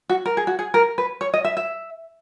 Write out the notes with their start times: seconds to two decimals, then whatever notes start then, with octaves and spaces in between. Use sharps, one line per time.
0.09 F#4
0.26 A#4
0.37 G#4
0.47 F#4
0.59 G#4
0.74 A#4
0.98 B4
1.21 C#5
1.34 D#5
1.45 E5
1.57 E5